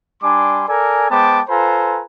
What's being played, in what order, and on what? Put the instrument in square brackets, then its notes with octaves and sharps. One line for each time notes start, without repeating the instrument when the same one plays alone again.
[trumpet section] G3 D4 G#5 C6 D6
A4 A#4 D5 G#5
G#3 B3 C5 G5 A5 D6
F4 A4 B4 C5 G#5 A#5